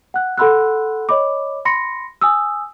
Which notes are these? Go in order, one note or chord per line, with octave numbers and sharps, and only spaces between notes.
F#5 F#6
A4 F#5 B5 C6 E6 F#6
C#5 D#5 B5 D6
B5 C6 A#6 C#7
G#5 D#6 E6